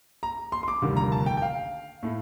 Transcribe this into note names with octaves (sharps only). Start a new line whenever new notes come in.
A#5
C6
C6
D6
F1 D#2 D3 G3 A#3
A#5
A5
G5
G5
F5
A2 A3